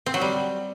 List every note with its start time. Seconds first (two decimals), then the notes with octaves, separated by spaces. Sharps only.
0.06 C4
0.14 F#3
0.21 G3